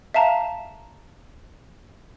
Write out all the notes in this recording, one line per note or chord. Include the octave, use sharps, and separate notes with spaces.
E5 F5 A5 A#5